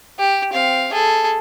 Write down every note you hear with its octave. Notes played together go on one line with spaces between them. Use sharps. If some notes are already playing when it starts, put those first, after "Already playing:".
G4
C4 F5
G#4 A4